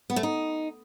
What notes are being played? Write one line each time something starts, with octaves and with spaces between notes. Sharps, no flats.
B3
A3
D#4